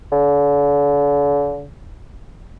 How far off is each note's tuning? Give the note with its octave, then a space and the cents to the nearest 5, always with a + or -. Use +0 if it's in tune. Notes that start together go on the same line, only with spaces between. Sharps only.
D3 -45